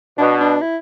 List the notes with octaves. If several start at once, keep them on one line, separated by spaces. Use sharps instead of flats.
B2 D4
D4
E4